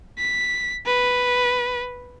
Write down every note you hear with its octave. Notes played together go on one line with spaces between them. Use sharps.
B6
B4